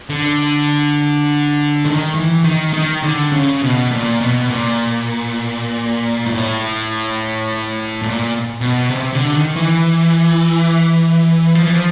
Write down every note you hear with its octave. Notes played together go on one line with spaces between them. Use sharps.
D3
D#3
E3
D#3
D#3
D3
C#3
B2
A#2
B2
A#2
A2
A#2
B2
C3
D3
D#3
E3
F3
E3
F3